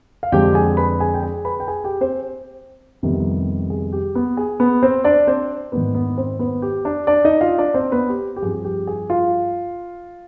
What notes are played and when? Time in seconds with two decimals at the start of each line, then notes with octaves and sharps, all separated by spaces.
0.23 F5
0.32 F2 D3 G#3 C4 G4 G5
0.55 G#4 G#5
0.77 B4 B5
1.00 G#4 G#5
1.14 G5
1.22 G#4 G#5
1.45 B4 B5
1.60 G5
1.68 G#4 G#5
1.84 G4 G5
2.01 C4 C5
3.03 F2 C3 D#3 G3 B3
3.70 G#4
3.93 G4
4.15 B3 B4
4.37 G#4
4.60 B3 B4
4.83 C4 C5
5.04 D4 D5
5.27 C4 C5
5.72 G#2 D#3 B3 D4 B4
5.95 B3 B4
6.18 C4 C5
6.39 B3 B4
6.62 G4
6.85 D4 D5
7.07 D4 D5
7.24 D#4 D#5
7.41 F4 F5
7.58 D4 D5
7.74 C4 C5
7.92 B3 B4
8.09 G4
8.36 G4
8.42 G2 F3 C4 G#4
8.65 G4
8.87 G#4
9.10 F4 F5